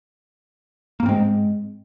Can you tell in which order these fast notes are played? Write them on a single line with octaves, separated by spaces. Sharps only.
A#3 G#2 C4 G#3